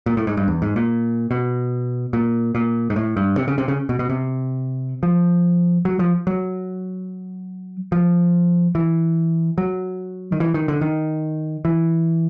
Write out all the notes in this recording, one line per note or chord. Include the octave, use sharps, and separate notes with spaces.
A#2
A2
G#2
G2
E2
G#2
A#2
B2
A#2
A#2
G#2
A2
G2
C3
C#3
C3
C#3
B2
B2
C3
F3
F#3
F3
F#3
F3
E3
F#3
D#3
E3
D#3
D3
D#3
E3